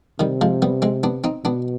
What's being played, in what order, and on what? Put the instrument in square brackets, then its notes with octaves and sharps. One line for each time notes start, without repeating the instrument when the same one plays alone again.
[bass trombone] C3 [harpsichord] D#3 G3
[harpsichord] F3 G#3
G3 B3
G#3 C4
B3 D4
C4 D#4
[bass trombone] B2 [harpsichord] B3 D4